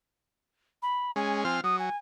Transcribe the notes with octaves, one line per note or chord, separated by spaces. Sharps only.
B5
G#3 C#4 G#5
F3 C4 G#5 F6
F#3 D#6
G#5